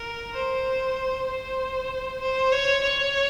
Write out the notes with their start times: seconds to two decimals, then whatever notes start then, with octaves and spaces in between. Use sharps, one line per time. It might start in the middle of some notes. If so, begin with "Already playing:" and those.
Already playing: A#4
0.34 C5
1.28 C5
2.21 C5
2.52 C#5
2.83 C#5